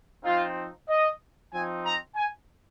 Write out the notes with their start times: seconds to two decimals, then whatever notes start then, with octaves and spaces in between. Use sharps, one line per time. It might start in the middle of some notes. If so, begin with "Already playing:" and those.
0.24 F3 C4 D#4 F4
0.88 D#5
1.51 F3 C4 D#4 G#5
1.84 A#5
2.15 G#5